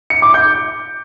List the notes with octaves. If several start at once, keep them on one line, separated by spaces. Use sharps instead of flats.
C#7
D6
G6